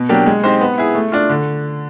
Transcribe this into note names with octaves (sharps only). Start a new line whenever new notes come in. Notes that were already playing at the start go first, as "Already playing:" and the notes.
Already playing: B2
F#3 A#3 D4 G4
G#3
C4 D#4 G4 C5
B3
E4 G#4
A3
D4 F4
D3